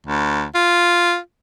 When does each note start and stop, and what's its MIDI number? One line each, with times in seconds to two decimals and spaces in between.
0.07 0.44 38
0.55 1.17 65